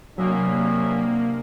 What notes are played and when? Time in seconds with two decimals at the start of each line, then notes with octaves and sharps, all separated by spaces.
0.18 C3 F#3 A#3 B3 C#4 D4 E5